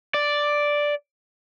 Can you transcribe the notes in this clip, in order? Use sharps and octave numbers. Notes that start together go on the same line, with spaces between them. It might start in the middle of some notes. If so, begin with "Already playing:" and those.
D5